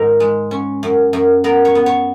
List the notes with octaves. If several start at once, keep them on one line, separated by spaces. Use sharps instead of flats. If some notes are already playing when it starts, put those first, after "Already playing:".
Already playing: G#2 D#3 A#4 C#5
G#3
C#4
F#2
F#2
B3 A#4
C#5
B3
C#5